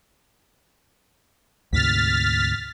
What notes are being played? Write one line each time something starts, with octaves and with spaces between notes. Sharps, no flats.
D2 G#2 C3 F6 A6 B6